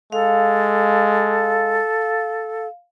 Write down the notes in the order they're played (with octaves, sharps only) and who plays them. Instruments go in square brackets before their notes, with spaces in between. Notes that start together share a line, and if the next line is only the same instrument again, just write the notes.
[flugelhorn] G#3 [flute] A4 [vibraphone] F5